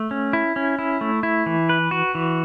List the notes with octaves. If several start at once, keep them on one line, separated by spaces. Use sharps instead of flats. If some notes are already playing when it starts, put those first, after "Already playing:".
Already playing: A3
C#4
E4
C#4
E4
A3
E4
E3
B4
F#4
E3